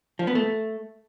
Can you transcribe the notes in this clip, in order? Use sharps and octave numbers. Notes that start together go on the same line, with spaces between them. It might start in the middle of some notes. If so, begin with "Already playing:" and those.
F3
B3
A3